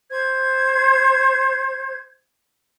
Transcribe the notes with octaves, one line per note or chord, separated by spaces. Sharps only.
C5 G#6